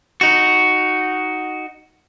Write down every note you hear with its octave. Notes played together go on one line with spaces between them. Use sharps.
D#4 F#4